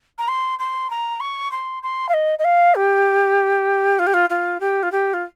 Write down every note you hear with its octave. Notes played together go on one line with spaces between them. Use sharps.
A#5
C6
C6
A#5
C#6
C6
C6
F5
D#5
D#5
F5
G4
F4
G4
F4
F4
G4
F4
G4
F4